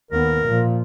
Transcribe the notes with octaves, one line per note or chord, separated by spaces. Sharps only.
D#2 B3 A#4
A#2 F3